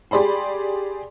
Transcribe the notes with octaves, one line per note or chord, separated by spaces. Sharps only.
G4 G#4 D5 B5 C6